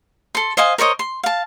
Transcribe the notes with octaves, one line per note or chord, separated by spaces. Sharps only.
A4 C6
C5 D#5 F5 G#5
A#4 C5 C#5 D#5
C6
F5 A5